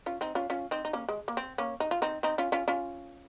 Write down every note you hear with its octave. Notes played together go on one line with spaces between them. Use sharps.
C#4 F4
C4 D#4
C#4 F4
C#4 F4
C4 D#4
D#4
A#3 C#4
G#3
A#3
C4
A#3 C#4
D#4
F4
C4 D#4
C4 D#4
C#4 F4
C#4 F4
C#4 F4